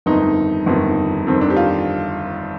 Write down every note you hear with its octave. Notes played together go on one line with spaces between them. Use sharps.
G1 F2 D#3 D#4
G1 F2 D#3
G1 F2 D#3 C4
D4
G4
F4